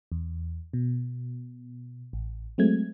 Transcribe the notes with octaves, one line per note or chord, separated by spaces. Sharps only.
E2
B2
A1
F#3 G#3 A3 C4 G#6